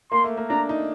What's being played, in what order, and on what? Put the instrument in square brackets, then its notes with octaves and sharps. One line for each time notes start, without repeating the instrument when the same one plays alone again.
[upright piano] A#3 [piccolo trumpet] C6
[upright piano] A3
A#3
[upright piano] D4 [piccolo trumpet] A#5
[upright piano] D#4